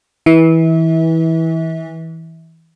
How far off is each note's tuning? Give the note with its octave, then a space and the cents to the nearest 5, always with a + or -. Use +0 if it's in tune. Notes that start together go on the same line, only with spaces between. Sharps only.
E3 -20 E5 -30